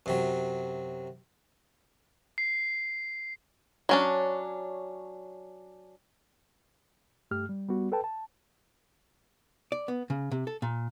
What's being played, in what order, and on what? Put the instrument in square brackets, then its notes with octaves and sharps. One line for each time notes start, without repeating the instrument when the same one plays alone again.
[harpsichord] F#2 C3 F#3
[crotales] C7
[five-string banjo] F#3 C#4 D4
[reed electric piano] G2 A3 G4 F6
G3
G3 B3 F#4
A4 B4 G5 A5
A5
[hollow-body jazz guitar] D5
B3
C#3
C3
A4
A#2